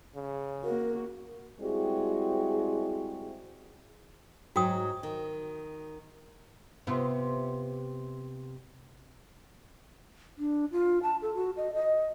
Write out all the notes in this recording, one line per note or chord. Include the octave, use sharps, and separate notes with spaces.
C#3
A#3 F#4 A#4
G3 G#3 C4 E4 F#4 G#4
G#2 F#3 F#4 G5 D#6
D#3
C3 B3 F4
D4
F4
A5
A4
F#4
D#5
D#5